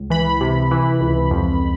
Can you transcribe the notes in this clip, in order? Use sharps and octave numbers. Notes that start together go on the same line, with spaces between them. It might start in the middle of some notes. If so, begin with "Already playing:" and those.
Already playing: C#2
E3 B5
C3
E3
C#2
F2